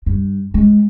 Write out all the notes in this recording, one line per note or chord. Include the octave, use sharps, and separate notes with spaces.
G2
G#3